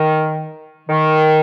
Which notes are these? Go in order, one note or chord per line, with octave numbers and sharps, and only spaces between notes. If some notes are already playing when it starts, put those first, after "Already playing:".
Already playing: D#3
D#3